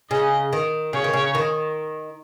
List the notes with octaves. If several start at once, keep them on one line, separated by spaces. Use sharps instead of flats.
C#3 D#5
D#3
C#3 C#5
D#3
C#3
D#3